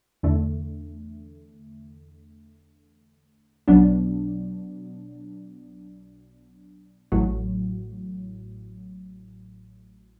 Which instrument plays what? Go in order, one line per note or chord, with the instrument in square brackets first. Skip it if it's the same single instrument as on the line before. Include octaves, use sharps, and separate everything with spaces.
[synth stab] E2 D3 A3
B1 B2 F#3 B3 D4
A1 A2 F#3